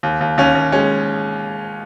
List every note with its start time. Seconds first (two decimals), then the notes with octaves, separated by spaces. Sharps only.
0.03 D#2
0.21 D#2
0.38 D#2 C#4
0.55 D#2
0.72 G#3 C#4